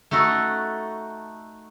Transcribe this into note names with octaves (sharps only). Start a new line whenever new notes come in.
A3 D#4 F#4 A4